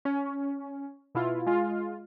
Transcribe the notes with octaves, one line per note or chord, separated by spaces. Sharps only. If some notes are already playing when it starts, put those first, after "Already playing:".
C#4
B2 E4 F4
G#3 F4